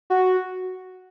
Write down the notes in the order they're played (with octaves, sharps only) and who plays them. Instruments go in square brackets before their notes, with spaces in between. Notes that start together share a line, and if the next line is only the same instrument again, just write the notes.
[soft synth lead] F#4